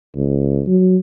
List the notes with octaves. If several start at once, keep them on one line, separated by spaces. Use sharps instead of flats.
C#2
F#3